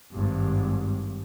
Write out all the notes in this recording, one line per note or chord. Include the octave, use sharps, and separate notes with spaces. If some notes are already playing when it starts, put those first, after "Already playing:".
G#1 G2